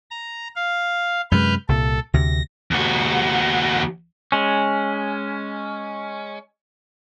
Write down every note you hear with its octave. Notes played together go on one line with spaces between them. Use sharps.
A#5
F5
F#2 C3 G#3 B4 F6 G6
C2 A#2 A4
D2 C3 A#6
D#2 F#4
G#3 C#4